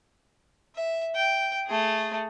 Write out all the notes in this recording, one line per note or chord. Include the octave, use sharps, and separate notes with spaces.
E5
G5
A3 G#4